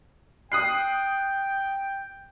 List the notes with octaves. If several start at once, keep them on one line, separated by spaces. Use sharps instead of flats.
G5 D#6 F#6 C7